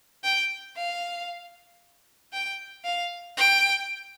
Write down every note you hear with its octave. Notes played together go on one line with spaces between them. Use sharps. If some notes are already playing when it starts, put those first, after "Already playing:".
G5
F5
G5
F5
G5